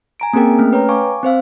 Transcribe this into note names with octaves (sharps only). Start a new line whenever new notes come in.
G#5 A#5 D7
A#3 C4 C#4 G#4 A#4 G5
A3 C#4 F6
B4 C#5 G5 A#5
F5 G#5 C#6 D6
C4 C5 F5 E6